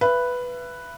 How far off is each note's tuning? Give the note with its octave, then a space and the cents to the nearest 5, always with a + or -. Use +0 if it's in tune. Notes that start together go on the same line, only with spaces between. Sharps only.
B4 +0 E5 +40